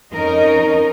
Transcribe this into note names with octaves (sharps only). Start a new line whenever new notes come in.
F2 C#4 D#4 A#4 D#5